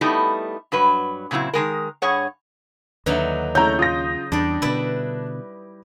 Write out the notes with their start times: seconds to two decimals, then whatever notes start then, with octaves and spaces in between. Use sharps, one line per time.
0.01 G3 A3 B3 D#4 E4
0.72 G2 F#3 B4
1.31 A#2 C#3 F#3 C4 E4
1.53 D#3 E3 G#3 A#4
2.02 G2 G#4 C#5 F#5
3.06 D#2 D3 F#3 D#4 B4 E5
3.55 C#3 A3 E4 C#5 A#5 G6
3.79 F4 D#6 A#6
4.32 E2 G3 D4 D5
4.62 B2 D3 E4 B4 D5